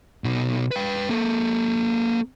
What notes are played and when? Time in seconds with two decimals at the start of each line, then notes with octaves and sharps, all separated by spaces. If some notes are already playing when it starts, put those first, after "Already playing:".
0.24 B2 D#4
0.71 B4 G5
1.10 A#3 A4